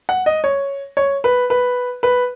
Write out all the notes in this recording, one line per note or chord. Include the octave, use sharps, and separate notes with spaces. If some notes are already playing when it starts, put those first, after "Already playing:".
F#5
D#5
C#5
C#5
B4
B4
B4